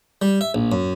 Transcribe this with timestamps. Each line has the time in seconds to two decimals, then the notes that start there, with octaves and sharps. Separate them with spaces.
0.22 G3
0.41 E5
0.54 A#1
0.72 F#2